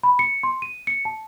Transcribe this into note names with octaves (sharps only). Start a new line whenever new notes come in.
B5
C#7
C6
D#7
C#7
A5